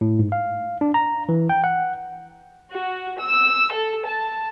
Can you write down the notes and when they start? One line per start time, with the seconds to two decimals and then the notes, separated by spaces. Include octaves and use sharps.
0.01 A2
0.19 G#2
0.32 F5
0.81 D4
0.94 A#5
1.29 E3
1.49 G5
1.64 F#5
2.72 F#4
3.20 E6
3.73 A4
4.06 A5